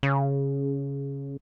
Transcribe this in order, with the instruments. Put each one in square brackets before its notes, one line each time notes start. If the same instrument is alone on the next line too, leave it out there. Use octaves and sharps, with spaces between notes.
[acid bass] C#3